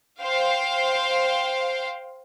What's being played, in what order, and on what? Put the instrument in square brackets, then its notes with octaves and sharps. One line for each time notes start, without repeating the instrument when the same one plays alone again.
[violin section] C5 F5 G5